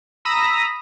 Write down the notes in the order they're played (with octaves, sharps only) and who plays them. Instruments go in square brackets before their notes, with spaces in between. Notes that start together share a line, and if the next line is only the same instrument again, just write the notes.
[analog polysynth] A#5 B5 D#6 E6 A#6 B6